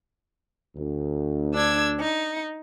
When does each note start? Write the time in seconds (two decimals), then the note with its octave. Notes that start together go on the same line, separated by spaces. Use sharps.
0.75 D2
1.55 D4 E6 G#6
2.00 D#4